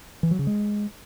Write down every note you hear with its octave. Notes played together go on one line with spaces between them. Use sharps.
E3
F#3
C#3
G#3